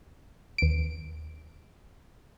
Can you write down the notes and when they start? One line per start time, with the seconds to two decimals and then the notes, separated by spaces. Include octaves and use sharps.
0.58 D#2 D7